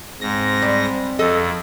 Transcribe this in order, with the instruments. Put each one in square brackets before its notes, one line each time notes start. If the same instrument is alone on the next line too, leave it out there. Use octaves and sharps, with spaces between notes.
[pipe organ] G#2 A#6 [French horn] C4
[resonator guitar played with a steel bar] G3
[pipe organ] F2 [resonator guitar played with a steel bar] A4 D#5